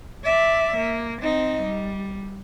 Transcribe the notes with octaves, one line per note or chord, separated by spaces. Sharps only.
D5 E5
A#3
C4 D#4
G3